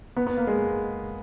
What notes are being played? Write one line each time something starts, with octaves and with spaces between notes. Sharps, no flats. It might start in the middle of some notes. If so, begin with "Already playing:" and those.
B3
B3
A#3
G#3